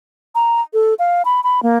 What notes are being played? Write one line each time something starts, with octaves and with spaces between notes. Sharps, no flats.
A#5
A4
F5
B5
B5
A#3